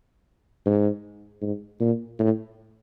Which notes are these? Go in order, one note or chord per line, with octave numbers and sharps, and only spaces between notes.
G#2
G#2
A#2
A2